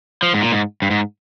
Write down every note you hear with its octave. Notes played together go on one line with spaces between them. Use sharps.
F3
G#2
A#2
G#2
G2
G#2